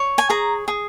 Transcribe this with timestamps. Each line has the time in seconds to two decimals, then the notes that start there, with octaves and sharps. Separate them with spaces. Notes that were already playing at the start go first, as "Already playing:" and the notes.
Already playing: C#5
0.18 G#5
0.30 G#4 A#5
0.68 G#4